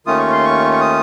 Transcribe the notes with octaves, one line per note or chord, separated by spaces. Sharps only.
D#2 D#3 A3 C#4 F4 D#6
C#6
C6
C#6
C#6
D#6